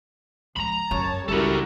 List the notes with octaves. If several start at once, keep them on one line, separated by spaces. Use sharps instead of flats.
F3 G#3 A#5 B5
F#2 C#5 A5
C#2 G3 E4 F#4 A4 A#4